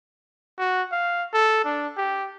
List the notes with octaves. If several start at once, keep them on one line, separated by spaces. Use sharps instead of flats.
F#4
F5
A4
D4
G4